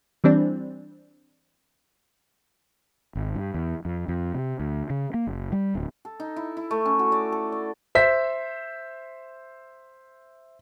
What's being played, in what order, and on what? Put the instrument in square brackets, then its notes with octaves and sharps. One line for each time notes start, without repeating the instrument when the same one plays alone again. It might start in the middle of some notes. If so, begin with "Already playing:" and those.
[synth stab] E3 G3 C4 D4
[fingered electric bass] G#1
G2
E2
F2
F2
C3
D2
C#3
A#3
F#1
G3
D1
[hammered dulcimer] A4
D#4
E4
E4
A3
C#4
F#4
D5
A4
D5
[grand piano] C5 E5 B6